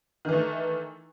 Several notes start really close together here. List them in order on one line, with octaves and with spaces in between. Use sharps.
D#3 E3 A3